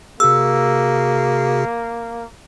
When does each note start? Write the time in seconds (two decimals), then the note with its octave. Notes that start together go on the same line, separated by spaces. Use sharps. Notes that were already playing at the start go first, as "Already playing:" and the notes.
0.20 C3 A#3 F#4 G#4 E6